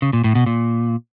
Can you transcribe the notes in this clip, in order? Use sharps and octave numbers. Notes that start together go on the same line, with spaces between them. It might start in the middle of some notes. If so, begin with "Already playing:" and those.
C#3
A#2
A2
B2
A#2